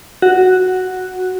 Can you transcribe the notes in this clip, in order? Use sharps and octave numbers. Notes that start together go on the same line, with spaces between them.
F#4